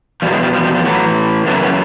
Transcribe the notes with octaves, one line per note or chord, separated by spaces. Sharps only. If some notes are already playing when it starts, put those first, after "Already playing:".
E2 B2 F3 G3
F#3 G#3
F3 G3
F3 G3
F3 G3
F3 G3
A2 E3 F#3
F#2 C#3 E3 A3 B3
B3 C#4